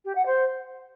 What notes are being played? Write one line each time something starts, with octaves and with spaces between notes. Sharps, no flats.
G4
F#5
C5